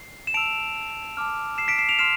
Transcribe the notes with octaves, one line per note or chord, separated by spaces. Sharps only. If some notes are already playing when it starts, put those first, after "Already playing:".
Already playing: C7
E7
A5 E6 D7 F7
A5 D6 F6
C7 E7
B6 D7
C7 E7
D7 F7
C6 F6 C7 E7